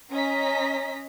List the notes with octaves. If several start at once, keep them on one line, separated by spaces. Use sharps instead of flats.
C#4 D#5 A#5 B6